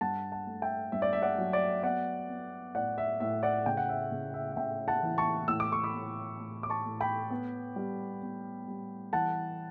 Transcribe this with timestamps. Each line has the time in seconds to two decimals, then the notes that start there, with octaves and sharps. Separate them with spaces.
0.01 G2 F#5 A5
0.32 F#5 A5
0.47 A3
0.62 E5 G5
0.92 G2 E5
1.02 D5
1.13 E5
1.22 D5 F#5
1.38 F#3
1.53 D5
1.83 B3 D5 F#5
2.29 B3
2.75 A2 D5 F#5
2.98 E5
3.20 A2 E5
3.43 D5 F#5
3.66 C#3 G5
3.77 F#5
3.89 E5
4.12 C#3
4.34 E5
4.53 F#5
4.57 C#3 E5 G5
4.88 F#5 A5
5.03 E3
5.18 A5 C#6
5.48 A2 E6
5.60 D6
5.72 C#6
5.84 B5 D6
5.95 A2
6.39 A2
6.63 D6
6.70 A5 C#6
6.85 A2
7.01 G5 B5
7.30 B3
7.76 G3
8.22 B3
8.68 G3
9.13 E3 F#5 A5